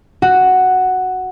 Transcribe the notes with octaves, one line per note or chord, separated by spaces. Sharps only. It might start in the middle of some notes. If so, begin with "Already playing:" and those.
F#4